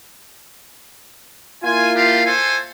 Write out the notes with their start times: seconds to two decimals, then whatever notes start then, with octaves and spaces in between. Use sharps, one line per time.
1.64 A#3 E4 F4 G#5
1.95 D4 G4 F5
2.25 A4 C5 G#5